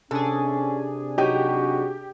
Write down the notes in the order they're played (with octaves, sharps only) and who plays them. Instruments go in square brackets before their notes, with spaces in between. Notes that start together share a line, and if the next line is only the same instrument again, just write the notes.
[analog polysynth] C3 D4 G#4 [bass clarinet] C#4 [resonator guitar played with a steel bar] A4
[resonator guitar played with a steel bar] F#3 D#4 [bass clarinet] F#4 [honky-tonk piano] G4